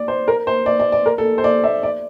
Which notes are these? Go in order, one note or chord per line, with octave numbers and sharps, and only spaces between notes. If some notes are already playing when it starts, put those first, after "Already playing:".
Already playing: D5
C5
A#4
C5
D5
D5
D5
A#4
A4
C5
D5
E5
D5